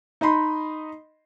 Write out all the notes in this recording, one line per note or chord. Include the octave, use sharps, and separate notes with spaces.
D#4 D#5 B5 C6